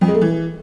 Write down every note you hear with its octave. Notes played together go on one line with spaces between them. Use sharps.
F2
G#3
A3
E3